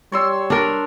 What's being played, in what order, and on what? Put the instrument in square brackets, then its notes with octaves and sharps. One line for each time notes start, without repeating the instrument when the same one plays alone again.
[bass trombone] G3 [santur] C#5 C6 E6
[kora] D4 A#4